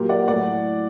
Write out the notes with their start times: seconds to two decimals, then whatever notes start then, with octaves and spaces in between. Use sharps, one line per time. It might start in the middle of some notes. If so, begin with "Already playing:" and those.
Already playing: A#2 F#3 A#3 G4 A#4
0.09 D5 F#5
0.28 A2 F#3 A3 D5 F#5